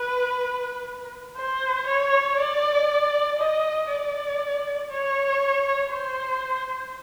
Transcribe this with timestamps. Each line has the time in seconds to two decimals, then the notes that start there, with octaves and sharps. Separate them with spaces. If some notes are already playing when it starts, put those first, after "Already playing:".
Already playing: B4
1.37 C5
1.87 C#5
2.38 D5
3.39 D#5
3.89 D5
4.91 C#5
5.92 C5